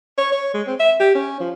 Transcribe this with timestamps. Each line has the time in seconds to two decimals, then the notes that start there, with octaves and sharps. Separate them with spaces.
0.18 C#5
0.32 C#5
0.54 G#3
0.67 C4
0.79 E5
1.00 G4
1.15 C#4
1.40 F3